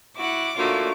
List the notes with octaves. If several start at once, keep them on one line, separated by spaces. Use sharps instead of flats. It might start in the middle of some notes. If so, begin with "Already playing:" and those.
E4 F#4 F#5 D6
D3 A3 A#3 D4 D#4 F4 F#4 C#5